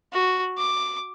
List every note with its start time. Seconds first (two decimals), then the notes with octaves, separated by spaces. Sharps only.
0.13 F#4
0.58 D6